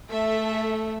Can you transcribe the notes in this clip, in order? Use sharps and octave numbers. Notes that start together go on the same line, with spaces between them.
A3 A4 E5